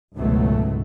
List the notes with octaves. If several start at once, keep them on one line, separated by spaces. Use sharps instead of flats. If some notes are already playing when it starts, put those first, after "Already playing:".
G#1 C#2 G#2 B2 F#3 A3